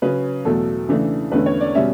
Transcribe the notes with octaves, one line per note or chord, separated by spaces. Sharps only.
C#3 F#3 C#4 B4
E2 B2 F#3 A3 A4
C#3 E3 A3 D4
E2 D3 A3 C#4 B4
C#5
D5
B2 G3 C#4 E5